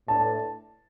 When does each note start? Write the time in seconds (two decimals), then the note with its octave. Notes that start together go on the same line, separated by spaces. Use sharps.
0.08 A2 A3 D4 B4 A5